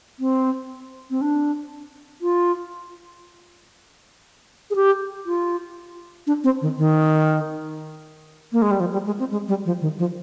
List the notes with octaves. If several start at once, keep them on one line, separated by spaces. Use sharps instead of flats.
C4
C4
D4
F4
G#4
G4
F4
D4
C4
D#3
D#3
A#3
G#3
G3
F3
G3
G#3
C4
G#3
G3
F3
D#3
F3